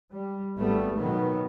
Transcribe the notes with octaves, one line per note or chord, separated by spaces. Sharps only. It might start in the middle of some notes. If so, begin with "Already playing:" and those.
G3
G#1 G3 A3 B3
B2 D#3 F#3 B3